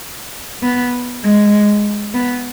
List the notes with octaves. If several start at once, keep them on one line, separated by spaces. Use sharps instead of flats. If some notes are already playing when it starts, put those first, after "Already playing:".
B3
G#3
B3